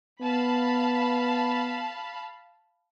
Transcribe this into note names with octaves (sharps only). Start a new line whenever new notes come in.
B3 F5 A5 B5